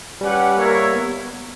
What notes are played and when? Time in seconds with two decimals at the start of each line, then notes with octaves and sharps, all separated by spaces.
0.21 G3 C#4 G4 B4 F#5
0.57 A#3 E4 A#4 C#5
0.93 B3